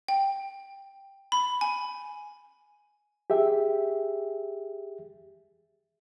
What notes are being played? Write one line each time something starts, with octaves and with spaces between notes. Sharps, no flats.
G5
B5
G#5
G4 G#4 E5